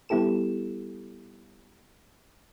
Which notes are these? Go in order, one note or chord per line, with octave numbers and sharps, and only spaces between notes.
G3 B3 E4 G4 A4 E7